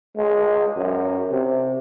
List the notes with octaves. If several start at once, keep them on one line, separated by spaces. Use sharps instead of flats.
G#3
F#2
C3